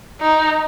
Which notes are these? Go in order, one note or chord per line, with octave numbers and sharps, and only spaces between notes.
D#4